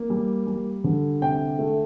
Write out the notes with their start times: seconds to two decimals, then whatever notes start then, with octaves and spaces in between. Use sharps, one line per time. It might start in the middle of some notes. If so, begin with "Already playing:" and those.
Already playing: A#3
0.10 G3
0.47 G3
0.84 D3
1.21 C3 G5
1.59 A3